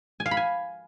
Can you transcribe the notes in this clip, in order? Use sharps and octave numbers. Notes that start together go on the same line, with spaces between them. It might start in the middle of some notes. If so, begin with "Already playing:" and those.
G#5
F5
B5
G#5